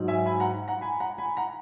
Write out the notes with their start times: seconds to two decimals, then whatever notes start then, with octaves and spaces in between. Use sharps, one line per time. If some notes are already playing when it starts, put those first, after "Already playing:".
Already playing: G#2 F#3
0.08 E5 G#5
0.26 G#5 B5
0.40 F#5 A#5
0.68 F#5 A#5
0.81 G#5 B5
1.00 F#5 A#5
1.18 G#5 B5
1.37 F#5 A#5